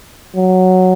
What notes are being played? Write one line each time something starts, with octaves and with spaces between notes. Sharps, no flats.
F#3